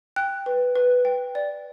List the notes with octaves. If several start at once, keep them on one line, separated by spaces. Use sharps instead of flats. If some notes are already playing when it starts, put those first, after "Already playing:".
G5 F#6
B4
B4
G5
D5